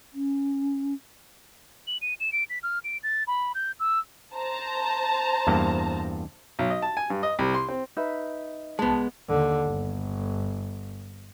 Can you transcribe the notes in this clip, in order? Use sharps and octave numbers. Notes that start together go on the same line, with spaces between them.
C#4
F#7
D#7
E7
D7
B6
F6
D7
A6
B5
G6
E6
C5 A5 A#5
E2 G2 A#3
B1
D#5
A5
G#5
G2
D#5
C2
C6
C4
D#4 B4 E5
C2 G#3 B3 A5
D#2 D3
G1